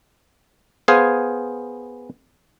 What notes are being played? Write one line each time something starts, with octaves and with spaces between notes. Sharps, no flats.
B3 G#4 C5 F5 G#5